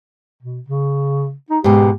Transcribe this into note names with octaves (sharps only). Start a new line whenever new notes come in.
B2
C#3
D#4
G#2 B2 G4